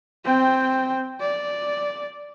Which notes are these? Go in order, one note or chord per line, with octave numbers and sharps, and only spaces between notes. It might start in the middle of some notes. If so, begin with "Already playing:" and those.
C4 G5
D5